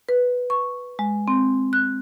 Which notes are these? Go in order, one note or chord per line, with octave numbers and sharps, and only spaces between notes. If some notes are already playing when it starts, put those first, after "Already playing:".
B4
C#6
G#3
C4
F#6